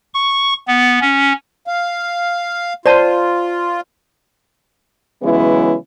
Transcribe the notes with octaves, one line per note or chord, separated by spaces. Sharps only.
C#6
B3
C#4
F5
F4 C5 D5 A5
C#3 E3 F#3 G#3 B3 E4